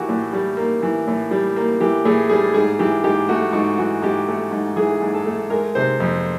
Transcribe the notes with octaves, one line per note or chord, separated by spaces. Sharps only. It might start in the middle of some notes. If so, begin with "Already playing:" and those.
Already playing: E3 A#3 F#4 G4
A2
G3
A#3
E3
A2
G3
A#3
E3 G4
A2 G#4
G3 G#4
G#2 G#4
E3 G4
G#2 G4
A3 F#4
G#2 F#4
E3 F#4
G#2 G4
A3
G#2
E3 G#4
G#2
A4
A3
G#3 A#4
C3 C5
F2